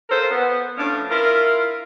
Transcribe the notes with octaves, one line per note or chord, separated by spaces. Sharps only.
F4 A4 A#4 C5
B3
A2 F3 C#4 D4
E4 F4 A#4